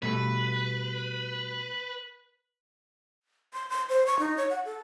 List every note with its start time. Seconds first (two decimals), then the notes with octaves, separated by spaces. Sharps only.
0.02 B2 G3 A3 B4
3.54 C6
3.70 C6
3.89 C5
4.07 C#6
4.19 D#4
4.37 C#5
4.50 F#5
4.65 A4